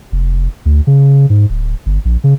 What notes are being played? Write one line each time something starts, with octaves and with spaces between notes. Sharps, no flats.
F1
D2
C#3
G#2
D1
G1
A#1
C#3